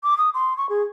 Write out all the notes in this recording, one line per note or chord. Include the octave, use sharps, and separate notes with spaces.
D6
D#6
C6
C#6
G#4